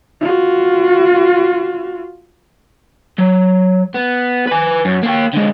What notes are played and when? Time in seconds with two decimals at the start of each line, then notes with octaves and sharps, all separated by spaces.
0.20 F4 F#4
3.18 F#3
3.95 B3
4.47 B4 G#5
4.85 F#2
5.03 A#3 G5
5.33 D3 G#3